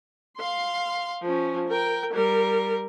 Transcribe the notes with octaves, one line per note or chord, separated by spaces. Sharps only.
F5 C6
F3 C#4
A#4 G5
G3 A#4